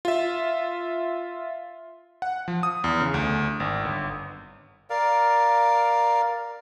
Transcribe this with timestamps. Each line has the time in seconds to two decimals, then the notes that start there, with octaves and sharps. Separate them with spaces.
0.05 F4 E5
2.22 F#5
2.48 F3
2.63 D#6
2.84 E2
3.01 C#3
3.14 D2
3.60 G#1
3.85 G1
4.90 A#4 D5 F5